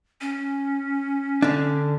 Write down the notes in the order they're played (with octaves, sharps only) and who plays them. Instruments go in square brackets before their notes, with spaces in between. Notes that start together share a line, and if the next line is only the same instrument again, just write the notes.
[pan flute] C#4
[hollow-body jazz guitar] D3 D4